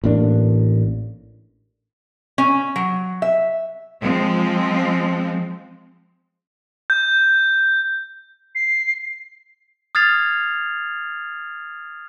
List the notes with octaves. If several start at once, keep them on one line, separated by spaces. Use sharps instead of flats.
A1 A2 A#3 D4
C#4
F#3
E5
F3 G#3 C4
G6
C7
D#6 F6 G#6 A6 C7 F7